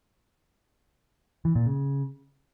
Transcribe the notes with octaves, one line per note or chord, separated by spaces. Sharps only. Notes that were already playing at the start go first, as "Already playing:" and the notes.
E3
A#2
C#3